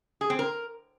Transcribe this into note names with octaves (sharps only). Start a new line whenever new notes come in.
G#4
C4
A#4